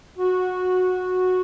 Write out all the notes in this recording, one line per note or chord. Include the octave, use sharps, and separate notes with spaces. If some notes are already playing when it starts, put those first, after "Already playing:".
F#4